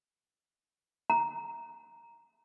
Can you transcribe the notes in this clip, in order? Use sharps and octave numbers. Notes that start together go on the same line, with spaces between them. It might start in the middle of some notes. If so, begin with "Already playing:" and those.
A#5